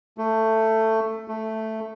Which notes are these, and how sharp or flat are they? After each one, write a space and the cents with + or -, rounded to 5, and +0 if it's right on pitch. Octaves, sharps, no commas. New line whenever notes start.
A3 +15
A3 +0